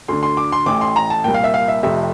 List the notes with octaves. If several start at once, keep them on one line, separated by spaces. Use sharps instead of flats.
D2 D3 C6
C6
D6
C6
A1 A2 E3 D6
C6
A#5
A5
C2 A#2 G5
F5
E5
F5
E5
F1 F2 C3 E5